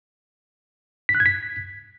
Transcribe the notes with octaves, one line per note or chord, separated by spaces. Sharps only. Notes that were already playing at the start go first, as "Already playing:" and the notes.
B6
F#6
G#6
B6